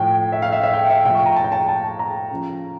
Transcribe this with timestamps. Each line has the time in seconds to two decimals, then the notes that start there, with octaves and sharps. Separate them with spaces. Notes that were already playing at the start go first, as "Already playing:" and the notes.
Already playing: A2 F3 G5
0.32 E5
0.42 F5
0.52 E5
0.63 E5
0.74 G5
0.90 E5
1.05 A2 F3 G5
1.15 C#6
1.26 A#5
1.36 A5
1.44 G5
1.52 A5
1.68 A5
1.99 A#5
2.31 C#3 F3